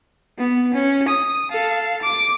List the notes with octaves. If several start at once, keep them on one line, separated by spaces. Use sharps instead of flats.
B3
C#4
D#6
A4 F5
D6